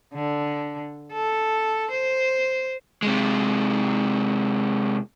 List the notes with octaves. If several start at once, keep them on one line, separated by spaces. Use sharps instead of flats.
D3
A4
C5
C3 G#3